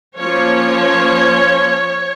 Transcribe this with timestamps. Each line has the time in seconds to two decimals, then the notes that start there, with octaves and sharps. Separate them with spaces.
0.18 F3 A#3 C#4 C#5